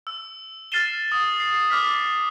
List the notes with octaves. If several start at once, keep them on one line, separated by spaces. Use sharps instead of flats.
E6
F6 A6 C7 D#7 E7 G7
D#6
C7
D6 F6 B6